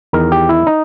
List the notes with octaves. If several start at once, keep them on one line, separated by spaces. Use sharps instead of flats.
E2 D#3 A#4
G4
E4
D#4